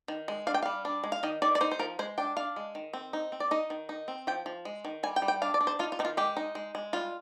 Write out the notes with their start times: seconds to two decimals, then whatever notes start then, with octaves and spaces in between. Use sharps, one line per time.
0.08 D#3
0.28 G#3
0.47 D4 F5
0.54 G5
0.63 G3 F5
0.85 D4
1.04 G#3
1.12 F5
1.23 D#3 D#5
1.42 D#3 D5
1.55 D5
1.61 D#4 C5
1.71 C5
1.79 F3 A#4
1.99 G#3 C5
2.18 D4 G5
2.37 D4 F5
2.56 G#3
2.75 D#3
2.93 C4
3.13 D#4
3.32 C4
3.40 D5
3.51 D#4 D#5
3.70 D#3
3.89 D#4
4.08 C4
4.27 F3 G5
4.46 F3
4.65 G#3
4.85 D#3
5.03 G3 G#5
5.16 G5
5.22 G3
5.28 G5
5.42 D4 F5
5.54 D5
5.61 D4
5.67 C5
5.79 D#4 F4
5.92 F4
5.99 D#3 D#4
6.05 F4
6.17 G#3 G4
6.37 D#4
6.55 G#3
6.75 G#3
6.93 G3 F4